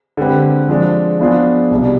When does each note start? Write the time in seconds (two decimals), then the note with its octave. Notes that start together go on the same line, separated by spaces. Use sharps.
0.17 D3 G#3 C4 G4 B4
0.69 F3 G#3 D4
1.19 F3 B3 D4 F4 G#4
1.71 C2 B2 G3